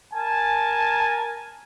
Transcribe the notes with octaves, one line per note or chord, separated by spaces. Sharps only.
A#4 G#5 A5